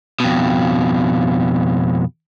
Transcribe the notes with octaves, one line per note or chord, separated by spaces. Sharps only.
F2 B2